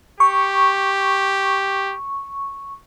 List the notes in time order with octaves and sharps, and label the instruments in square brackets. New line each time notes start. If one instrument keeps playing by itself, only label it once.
[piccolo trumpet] G4 [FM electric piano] C#6